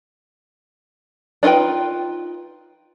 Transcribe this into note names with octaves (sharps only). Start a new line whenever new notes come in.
D4 D#4 F4 B4 G5